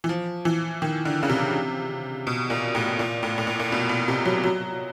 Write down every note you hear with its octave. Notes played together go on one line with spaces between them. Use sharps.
E3
F3
E3
D#3
D3
C#3
C3
B2
A#2
A2
A#2
A2
A2
A#2
A#2
B2
B2
C3
F#3
F#3